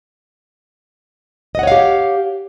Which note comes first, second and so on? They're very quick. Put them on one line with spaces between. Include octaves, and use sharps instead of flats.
D#5 F#5 C#5 F5 G4